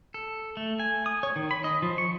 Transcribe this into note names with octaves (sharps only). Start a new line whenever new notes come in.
A4
A3
G#5
D#6
C#5
D#3
B5
D#5
F3
C#6